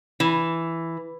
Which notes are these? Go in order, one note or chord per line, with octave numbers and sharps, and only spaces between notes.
E3